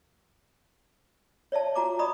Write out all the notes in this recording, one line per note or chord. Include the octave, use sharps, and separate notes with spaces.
C#5 D5 E5 A5
F4 F#4 A#5 D6
D5 D#5 A#5 B5 C#6 D#6